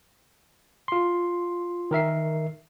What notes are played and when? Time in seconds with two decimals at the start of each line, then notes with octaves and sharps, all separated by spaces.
0.88 F4 C6
1.91 D#3 A#4 E5 C7